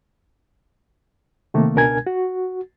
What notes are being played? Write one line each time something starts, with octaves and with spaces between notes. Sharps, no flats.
C3 D#3 A3 A#3
C#2 B2 D4 A#4 G#5 G#6
F#4